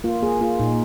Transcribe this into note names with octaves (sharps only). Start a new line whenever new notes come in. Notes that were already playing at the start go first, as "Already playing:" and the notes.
A#3 F4
A#3 G#4
A#3 F4
A#2 D#4